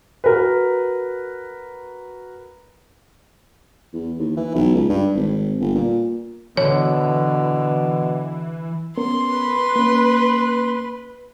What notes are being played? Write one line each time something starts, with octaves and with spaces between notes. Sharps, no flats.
F#4 A#4 B4
E2
D#2
E3
B1
C#2
G2
G#1
G1
A#2
B2 D3 E3 C#5
B3 C#4 A#4 C6
B4
A#3 C#4